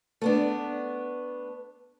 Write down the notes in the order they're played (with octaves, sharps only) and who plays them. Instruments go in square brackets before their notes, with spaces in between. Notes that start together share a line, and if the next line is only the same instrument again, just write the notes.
[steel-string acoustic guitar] A3 B3 D4